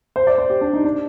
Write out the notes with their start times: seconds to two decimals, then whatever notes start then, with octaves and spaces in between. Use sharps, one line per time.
0.16 C5
0.27 D5
0.38 C5
0.50 G4
0.61 D4
0.73 D#4
0.85 D4